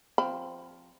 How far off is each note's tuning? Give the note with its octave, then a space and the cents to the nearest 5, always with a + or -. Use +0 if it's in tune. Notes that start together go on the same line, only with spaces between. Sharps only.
F3 +0 C4 +0 B5 +15